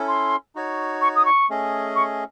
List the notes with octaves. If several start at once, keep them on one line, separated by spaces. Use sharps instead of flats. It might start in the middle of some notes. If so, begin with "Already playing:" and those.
Already playing: C#4 E4 A4
C6
D#4 F#4 C#5
C#6
D#6
C#6
A3 C#4 G#4 D#5
C#6